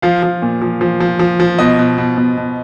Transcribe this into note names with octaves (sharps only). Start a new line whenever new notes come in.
F3 F5
F3
A#2
F3
F3
F3
F3
F3
B2 D#5
B2
B2
B2
B2